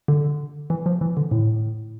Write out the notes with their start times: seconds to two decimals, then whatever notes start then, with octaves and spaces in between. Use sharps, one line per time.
0.08 D3
0.70 E3
0.86 F3
1.01 E3
1.17 D3
1.31 A2